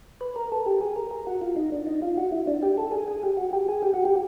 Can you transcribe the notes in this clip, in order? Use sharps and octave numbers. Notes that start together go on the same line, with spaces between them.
B4
A#4
A4
G4
G#4
A#4
A#4
F#4
F4
D#4
D4
D#4
F4
F#4
E4
D4
G4
A4
G#4
G#4
G4
F#4
G4
G#4
G4
F#4
G4